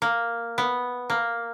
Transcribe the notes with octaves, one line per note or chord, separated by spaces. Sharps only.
A#3
B3
A#3